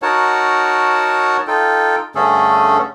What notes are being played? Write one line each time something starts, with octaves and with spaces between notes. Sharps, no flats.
D#4 F#4 A#4 C#5 F#5 A5
D#4 F4 A4 G5
G2 D3 A3 C#4 G#4 A4